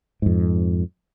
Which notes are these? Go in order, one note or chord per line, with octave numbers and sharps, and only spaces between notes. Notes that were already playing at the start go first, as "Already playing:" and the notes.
F2 G#2